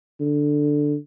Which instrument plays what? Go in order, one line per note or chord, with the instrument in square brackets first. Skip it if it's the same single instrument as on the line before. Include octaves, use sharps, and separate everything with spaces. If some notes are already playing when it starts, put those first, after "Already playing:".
[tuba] D3